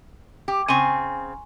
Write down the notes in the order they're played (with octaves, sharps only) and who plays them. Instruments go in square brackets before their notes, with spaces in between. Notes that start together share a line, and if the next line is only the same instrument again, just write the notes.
[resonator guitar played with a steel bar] G4
[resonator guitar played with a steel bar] C#3 C4 [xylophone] G#5 C6 C#6